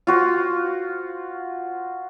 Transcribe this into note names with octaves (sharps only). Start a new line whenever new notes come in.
F4 F#4 C5